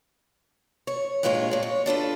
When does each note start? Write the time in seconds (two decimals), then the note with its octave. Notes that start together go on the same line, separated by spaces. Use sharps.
0.87 C#5
1.23 G2 A#2 G#3 F4 B4 C#5
1.51 A#2 G#3
1.63 C#5
1.86 D4 F4 A4 B4